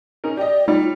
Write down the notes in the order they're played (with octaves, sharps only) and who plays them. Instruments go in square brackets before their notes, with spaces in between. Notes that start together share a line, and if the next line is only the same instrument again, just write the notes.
[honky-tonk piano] C#4 D#4 A#4
[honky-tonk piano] G4 D#5 [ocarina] D5
[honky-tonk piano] G3 C#5 [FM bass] D#4 [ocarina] F4